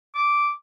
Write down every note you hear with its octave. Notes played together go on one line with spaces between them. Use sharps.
D6